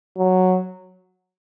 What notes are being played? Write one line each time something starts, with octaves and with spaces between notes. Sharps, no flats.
F#3